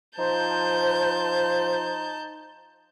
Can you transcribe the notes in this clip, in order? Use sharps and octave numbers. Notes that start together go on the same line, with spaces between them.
F3 D#4 C5 A5 G6